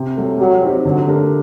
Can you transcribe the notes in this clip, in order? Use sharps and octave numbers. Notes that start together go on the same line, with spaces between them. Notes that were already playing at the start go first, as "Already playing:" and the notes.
Already playing: C3
F#3 A3
F#3 G3
C4 D#4 G4
D3 F#3
A3 D4 G4 A#4